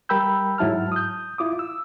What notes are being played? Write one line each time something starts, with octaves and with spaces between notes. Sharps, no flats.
G3 A#4 G5 B5 E6 G6
G#2 F#3 E4 A5 F6
D#6 G6
E4 F4 D6 D#6
E6